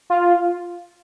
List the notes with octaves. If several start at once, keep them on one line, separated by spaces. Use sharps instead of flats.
F4